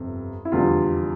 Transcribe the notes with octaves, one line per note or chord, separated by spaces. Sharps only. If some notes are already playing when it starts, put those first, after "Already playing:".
Already playing: G1 F2 C3
E4
F1 E2 D3 G3 F4